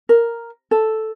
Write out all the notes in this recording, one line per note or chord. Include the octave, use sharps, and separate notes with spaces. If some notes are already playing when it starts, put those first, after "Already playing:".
A#4
A4